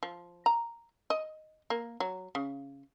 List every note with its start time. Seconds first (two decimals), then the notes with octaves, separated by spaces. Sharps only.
0.03 F3
0.46 A#5
1.10 D#5
1.70 A#3
2.00 F#3
2.35 C#3